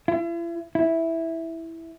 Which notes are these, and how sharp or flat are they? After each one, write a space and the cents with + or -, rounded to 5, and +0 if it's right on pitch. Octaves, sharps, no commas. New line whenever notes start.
E4 +40
E4 -5